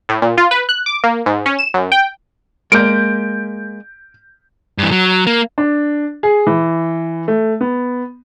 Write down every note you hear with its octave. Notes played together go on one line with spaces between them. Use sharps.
A2
A#2
F4
B4
F#6
D6
A#3
G#2
C#4
E7
F#2
G5
G#3 A#3 G6 D7
G2 E3
F#3
A#3
D4
G#4
E3
A3
B3